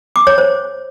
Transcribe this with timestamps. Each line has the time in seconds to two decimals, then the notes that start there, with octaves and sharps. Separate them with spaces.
0.16 D6
0.27 C#5
0.38 C5